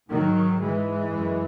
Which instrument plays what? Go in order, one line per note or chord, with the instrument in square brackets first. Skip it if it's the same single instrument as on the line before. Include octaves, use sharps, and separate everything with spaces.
[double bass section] G#2 D#3 F#3
E3 G#3
F#2